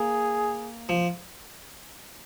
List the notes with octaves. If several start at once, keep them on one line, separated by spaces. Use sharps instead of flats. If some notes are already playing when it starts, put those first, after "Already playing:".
Already playing: A#3 G#4
F3